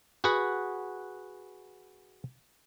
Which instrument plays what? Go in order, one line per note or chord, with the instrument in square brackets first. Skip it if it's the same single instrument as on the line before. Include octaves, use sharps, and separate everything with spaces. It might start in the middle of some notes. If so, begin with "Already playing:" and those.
[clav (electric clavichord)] F#4 G#4 B4 F#5